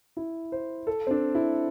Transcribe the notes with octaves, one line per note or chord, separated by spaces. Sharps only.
E4
C5
A4
C4
D4
E4